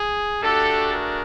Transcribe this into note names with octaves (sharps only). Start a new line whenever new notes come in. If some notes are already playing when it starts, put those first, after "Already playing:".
Already playing: G#4
A3 D4 F#4 G4 A4
G#4 A#4